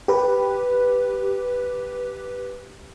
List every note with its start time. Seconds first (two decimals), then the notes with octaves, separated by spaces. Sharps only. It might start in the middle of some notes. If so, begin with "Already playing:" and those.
0.08 G4 B4